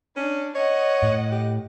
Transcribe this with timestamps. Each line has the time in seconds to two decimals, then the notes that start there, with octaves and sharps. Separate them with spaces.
0.17 C#4 D4
0.55 C#5 D#5 F#5
1.03 A2
1.32 G4